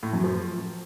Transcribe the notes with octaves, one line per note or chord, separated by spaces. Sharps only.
A2
F#2
F3